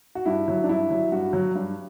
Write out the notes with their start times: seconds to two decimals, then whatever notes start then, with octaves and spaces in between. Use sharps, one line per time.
0.15 F#4
0.26 G2 E4
0.48 F#3
0.64 D4
0.69 G2 E4
0.91 F#3
1.12 G2 F#4
1.33 F#3
1.55 G2